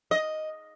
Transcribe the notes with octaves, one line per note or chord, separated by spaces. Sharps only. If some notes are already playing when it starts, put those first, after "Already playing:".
D#5